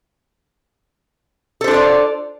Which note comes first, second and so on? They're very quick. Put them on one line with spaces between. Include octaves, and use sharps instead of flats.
A4 C5 D4 F4 D5